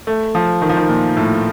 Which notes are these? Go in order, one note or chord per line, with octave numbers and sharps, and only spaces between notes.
A3
F3
D#3
F3
D#3
A#2
A2